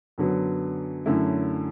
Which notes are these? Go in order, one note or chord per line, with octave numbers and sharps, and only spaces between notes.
F#2 D3 F#3 B3
F#2 D3 A3 C#4 E4